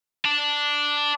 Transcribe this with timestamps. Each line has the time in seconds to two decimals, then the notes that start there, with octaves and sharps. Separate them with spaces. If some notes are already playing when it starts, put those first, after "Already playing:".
0.25 D5 A5